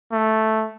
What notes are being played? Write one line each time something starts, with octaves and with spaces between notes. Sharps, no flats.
A3